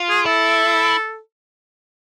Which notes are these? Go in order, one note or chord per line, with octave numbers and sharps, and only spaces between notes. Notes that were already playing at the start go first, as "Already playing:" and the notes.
Already playing: F4
G#4
E4 A4